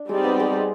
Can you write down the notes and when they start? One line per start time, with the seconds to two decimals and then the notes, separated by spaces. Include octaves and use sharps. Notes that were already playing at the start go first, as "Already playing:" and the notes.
Already playing: D4
0.09 G3 G#3 C4 D#4 G4 D5
0.24 B3
0.40 G#3